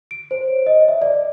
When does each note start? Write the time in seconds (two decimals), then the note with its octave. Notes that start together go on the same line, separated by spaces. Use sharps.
0.11 D7
0.31 C5
0.48 C#5
0.66 D#5
0.88 E5
1.02 D5